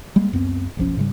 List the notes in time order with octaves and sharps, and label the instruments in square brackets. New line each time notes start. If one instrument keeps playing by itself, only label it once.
[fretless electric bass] G3 G#3 A#3
C#2 F#2 B3 C4
F#1 B1 F3 C#4
G#2 C#3 G3